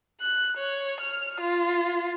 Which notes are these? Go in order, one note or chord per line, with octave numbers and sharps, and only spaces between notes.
F#6
C#5
F6
F4